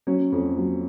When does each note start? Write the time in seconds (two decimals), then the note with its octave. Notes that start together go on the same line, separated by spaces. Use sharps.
0.07 F#3 C#4
0.32 F2
0.57 F#3